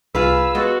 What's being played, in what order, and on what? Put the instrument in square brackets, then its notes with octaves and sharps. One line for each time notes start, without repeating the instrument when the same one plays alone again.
[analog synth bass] C2 [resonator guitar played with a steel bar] F4 G#4 B4 [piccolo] E6
[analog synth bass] G#3 [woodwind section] B3 F#4 A4